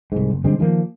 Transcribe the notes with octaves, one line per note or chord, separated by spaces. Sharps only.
C2 G#2
F#1
D3 G3 G#3 C4
D#3 F3 G3 A#3